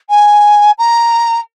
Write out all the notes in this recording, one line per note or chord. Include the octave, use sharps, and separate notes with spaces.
G#5
A#5